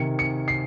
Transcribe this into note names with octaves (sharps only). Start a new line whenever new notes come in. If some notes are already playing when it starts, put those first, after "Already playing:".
Already playing: C3 D#3 C#7
C#7
C7